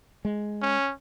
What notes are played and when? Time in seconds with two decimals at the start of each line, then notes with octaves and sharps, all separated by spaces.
0.25 G#3
0.62 C#4